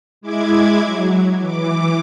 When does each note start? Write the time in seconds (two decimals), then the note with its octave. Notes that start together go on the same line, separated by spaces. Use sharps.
0.21 G#3 E4 D6 G#6
0.84 F#3
1.40 E3 D6